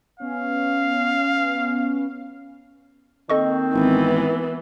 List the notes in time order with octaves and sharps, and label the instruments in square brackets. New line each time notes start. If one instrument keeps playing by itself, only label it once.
[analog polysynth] B3 C#4 [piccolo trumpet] F5
[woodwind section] D#3 A#3 C4 [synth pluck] A4 D#5 C#6
[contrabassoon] G#1 [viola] E3 B3